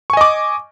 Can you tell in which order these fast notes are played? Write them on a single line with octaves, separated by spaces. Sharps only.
C#6 G#5 D#5 D6